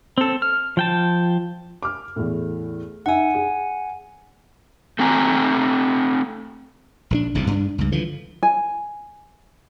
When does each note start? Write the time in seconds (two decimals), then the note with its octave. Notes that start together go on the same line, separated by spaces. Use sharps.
0.18 C4 A4
0.42 F6
0.77 F3 G5 A5
1.83 D6 F6
2.16 E2 A2
3.06 D#4 E5 F#5 G#5
3.34 G#4
4.99 A3 C4 G#5 A#5
7.11 A#1 E3 D4
7.34 G1 C2 C3
7.47 G2 C4 D4
7.78 C#2 G2
7.92 D3 E3 F3
8.43 G#5